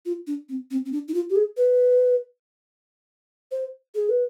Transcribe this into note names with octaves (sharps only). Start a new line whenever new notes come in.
F4
D4
C4
C4
C4
D4
D#4
F4
G4
G#4
B4
C5
G#4
B4